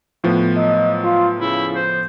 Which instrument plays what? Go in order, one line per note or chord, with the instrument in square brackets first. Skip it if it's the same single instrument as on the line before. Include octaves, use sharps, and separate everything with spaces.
[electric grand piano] A2 F3 B3
[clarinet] F#3 [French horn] D#5
[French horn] F4
[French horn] C#3 [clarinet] E4
[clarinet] C5